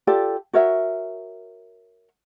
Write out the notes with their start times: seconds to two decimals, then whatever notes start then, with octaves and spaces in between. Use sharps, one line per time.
0.07 F4 G4 A4 D5
0.53 F#4 A#4 C#5 E5